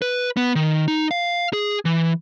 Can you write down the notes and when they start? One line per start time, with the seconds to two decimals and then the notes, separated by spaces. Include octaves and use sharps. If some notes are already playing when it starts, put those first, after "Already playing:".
0.02 B4
0.37 B3
0.55 D#3
0.88 D#4
1.11 F5
1.53 G#4
1.85 E3